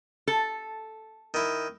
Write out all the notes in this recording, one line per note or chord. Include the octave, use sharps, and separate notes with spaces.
A4
D#3 E4